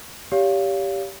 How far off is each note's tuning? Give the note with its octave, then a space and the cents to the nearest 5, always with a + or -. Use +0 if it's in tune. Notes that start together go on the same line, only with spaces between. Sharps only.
G4 +0 C#5 +40 F5 -5